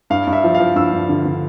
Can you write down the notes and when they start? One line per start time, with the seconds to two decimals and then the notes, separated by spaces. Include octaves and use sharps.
0.10 G2 F5
0.27 G2
0.33 E5
0.44 F3
0.55 F5
0.60 F3
0.76 G2 E6
0.93 G2
1.09 D3
1.25 D3